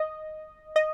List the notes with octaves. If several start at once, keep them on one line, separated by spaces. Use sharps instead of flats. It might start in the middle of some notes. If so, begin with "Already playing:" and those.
Already playing: D#5
D#5